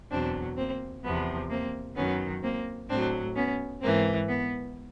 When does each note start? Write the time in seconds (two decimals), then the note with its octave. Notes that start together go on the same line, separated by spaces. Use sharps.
0.10 E2 B2 F#3 C4 D4
0.57 A#3 C4
1.03 E2 C3 F3 B3
1.49 A#3 C4
1.96 F#2 D#3 F#3 B3 C#4
2.42 A#3 C4
2.89 A2 F#3 C4 D4
3.35 B3 C#4
3.81 G#2 E3 A#3 C4
4.28 B3